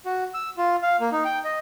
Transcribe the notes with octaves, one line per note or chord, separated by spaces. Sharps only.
F#4
E6
F4
F5
A#3
D#4
G5
D#5